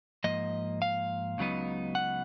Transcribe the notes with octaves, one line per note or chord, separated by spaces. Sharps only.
G#2 F3 A#3 D#5
F5
C#2 C#3 F#3 B3 D#4
F#5